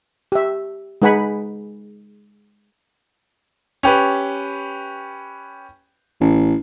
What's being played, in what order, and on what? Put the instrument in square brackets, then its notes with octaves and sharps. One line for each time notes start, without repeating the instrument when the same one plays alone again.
[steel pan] G4 E5
G#3 D#4 B4 F#5 G#5 B5
[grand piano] C#4 G4 B4
[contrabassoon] A1